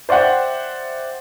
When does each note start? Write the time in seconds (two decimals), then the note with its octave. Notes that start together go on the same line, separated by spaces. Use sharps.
0.09 C5 D5 E5 F#5 G5